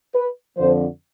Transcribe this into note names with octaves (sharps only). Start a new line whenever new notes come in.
B4
F2 D3 F3 C5